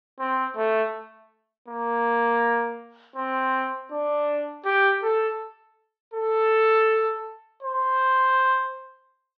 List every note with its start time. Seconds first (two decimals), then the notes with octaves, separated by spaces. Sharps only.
0.19 C4
0.56 A3
1.68 A#3
3.16 C4
3.91 D4
4.65 G4
5.03 A4
6.14 A4
7.63 C5